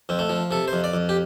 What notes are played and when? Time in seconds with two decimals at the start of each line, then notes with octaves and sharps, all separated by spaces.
0.09 F2 C4
0.19 A3
0.29 F3
0.51 C3 A4
0.68 C5
0.73 F2
0.84 D5
0.94 F2
1.09 G4